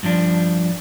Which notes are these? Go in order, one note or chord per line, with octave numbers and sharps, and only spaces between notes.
G2 F3 D4